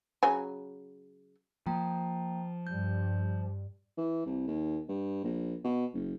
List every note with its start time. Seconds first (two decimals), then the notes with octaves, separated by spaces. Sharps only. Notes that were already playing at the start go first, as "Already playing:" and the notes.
0.23 C#3 F#3 G#5
1.67 F3 A#3 G5 A#5
2.67 G2 G3 G6
3.97 E3
4.26 C2
4.47 D#2
4.89 G2
5.24 A#1
5.64 B2
5.94 F#1